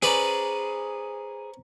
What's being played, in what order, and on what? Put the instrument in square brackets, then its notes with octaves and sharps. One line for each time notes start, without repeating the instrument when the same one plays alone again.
[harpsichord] C#4 B4 D5 [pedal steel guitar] G#4 [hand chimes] C5 A#5